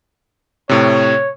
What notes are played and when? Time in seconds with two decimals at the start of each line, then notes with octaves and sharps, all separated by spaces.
0.69 A2 C3 C#5